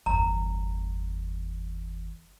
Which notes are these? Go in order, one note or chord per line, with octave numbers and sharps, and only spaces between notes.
G1 E2 A#5